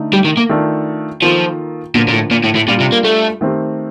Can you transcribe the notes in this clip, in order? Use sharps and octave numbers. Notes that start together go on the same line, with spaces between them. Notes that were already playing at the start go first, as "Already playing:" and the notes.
Already playing: D3 A3 D#4
G3
D#3
A#3
D#3 A3 D4 F4 A4
D#3 F3 A#3 F4 A4
A#2 D3 F3 A#3
A#2
A2
A#2
A2
A2
A#2 G3 D4 F4
C3
A#3
A3
D#3 A3 C4 G4